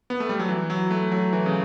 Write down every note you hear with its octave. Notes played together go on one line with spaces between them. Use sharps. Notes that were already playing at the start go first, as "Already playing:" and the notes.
B3
A3
G3
F#3
E3
F#3
A3
F#3
E3
C#3